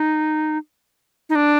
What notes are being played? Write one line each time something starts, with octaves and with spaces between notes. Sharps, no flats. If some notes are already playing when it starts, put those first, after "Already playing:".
Already playing: D#4
D#4
D4